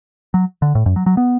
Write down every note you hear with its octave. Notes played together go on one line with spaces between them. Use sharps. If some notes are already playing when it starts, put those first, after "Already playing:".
F#3
D3
A2
F#2
F#3
F#3
B3